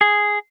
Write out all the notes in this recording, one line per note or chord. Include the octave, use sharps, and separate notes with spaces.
G#4